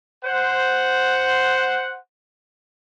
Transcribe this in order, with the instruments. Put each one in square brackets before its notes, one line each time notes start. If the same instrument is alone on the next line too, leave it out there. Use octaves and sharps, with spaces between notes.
[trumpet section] C5 F#5